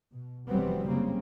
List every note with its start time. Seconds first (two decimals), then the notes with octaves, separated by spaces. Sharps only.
0.13 B2
0.49 F1 E3 F#3 G3 B3 C4
0.88 C#3 A#3 C4